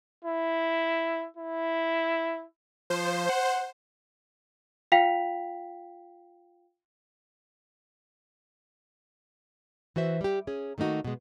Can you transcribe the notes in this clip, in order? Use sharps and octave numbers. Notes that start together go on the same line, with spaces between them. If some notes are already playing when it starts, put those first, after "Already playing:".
E4
E4
F3 C5
F#5
F4 F5 G5 B6 F7
E3 F#4 C5 E5
G3 G4
C#4 G#4
D#3 A3 A#3 D#4 F#4
B2 G#3